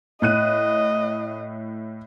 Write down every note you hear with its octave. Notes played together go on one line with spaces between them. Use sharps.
A2 D#5 F#6 D#7